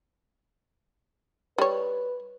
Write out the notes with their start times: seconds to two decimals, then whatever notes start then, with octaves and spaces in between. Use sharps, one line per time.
1.58 G3 B4 C#5